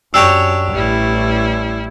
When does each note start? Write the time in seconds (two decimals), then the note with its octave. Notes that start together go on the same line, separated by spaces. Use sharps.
0.14 F#2 D4 G4 C#5 E6
0.74 A1 G3 E4